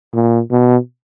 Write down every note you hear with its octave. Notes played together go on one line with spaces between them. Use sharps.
A#2
B2